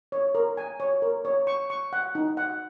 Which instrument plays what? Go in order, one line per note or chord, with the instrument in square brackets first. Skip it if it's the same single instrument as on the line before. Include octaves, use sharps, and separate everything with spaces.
[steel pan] C#5
A#4
G#5
C#5
A#4
C#5
C#6
C#6
F#5
D#4
F#5